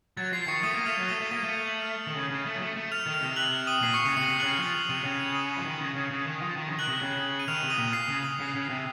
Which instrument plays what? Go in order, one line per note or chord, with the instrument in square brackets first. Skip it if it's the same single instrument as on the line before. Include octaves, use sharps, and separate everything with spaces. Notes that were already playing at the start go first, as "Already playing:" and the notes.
[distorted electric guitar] F#3 [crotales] A6
[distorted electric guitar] F3 [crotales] C7
[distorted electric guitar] D#3 [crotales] C#6 C#7
[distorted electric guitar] A3 [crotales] D#6 D#7
[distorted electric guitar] A#3
[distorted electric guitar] A3 [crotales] F6 F7
[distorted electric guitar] F#3
[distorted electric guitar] A3 [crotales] D#6 D#7
[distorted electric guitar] A3
[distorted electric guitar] A#3 [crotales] D#6 D#7
[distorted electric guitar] A3
[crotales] F7
F#7
F6 F7
[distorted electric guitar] D#3
C#3
C#3
A3
F#3
A3
A3
[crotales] F6 F7
[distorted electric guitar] D#3
[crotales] F6 F7
[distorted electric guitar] C3
[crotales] F#6 F#7
D#6 D#7
[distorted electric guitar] A#2 [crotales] C7
[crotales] C#6 C#7
[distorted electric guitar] C#3 [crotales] D#6 D#7
[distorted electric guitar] C3 [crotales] C#6 C#7
[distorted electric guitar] C3 [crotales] C7
[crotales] F#6 F#7
[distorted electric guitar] C#3
[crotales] F6 F7
[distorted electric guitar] F3 [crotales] D#6 D#7
[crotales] F6 F7
[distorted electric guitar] C3 [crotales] D#6 D#7
[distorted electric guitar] C#3 [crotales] F6 F7
[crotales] F6 F7
D#6 D#7
[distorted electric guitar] F3
D#3
C#3
C#3
C#3
D#3
F3
D#3
C#3
D#3
[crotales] F#6 F#7
[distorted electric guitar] C3
C#3
[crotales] D#7
[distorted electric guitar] D#3 [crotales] F6 F7
[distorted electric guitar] C3
[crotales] D#6 D#7
[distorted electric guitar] A#2
[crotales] C7
[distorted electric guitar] C#3 [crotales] D#6
[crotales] D#6
[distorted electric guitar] C#3
C#3
C3